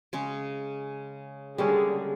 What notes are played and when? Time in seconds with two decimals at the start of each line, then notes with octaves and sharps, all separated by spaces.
0.13 C#3 G#3 C#4
1.58 D3 G3 G#3 A#3 C#4 G#4